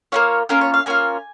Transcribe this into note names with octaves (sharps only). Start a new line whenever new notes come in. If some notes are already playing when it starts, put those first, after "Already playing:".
A#3 C#4 F4 C#5
A#3 C#4 F4 A#4
C#5
F5
A#3 C#4 F4 G#5